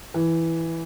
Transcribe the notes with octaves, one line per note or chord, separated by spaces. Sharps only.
E3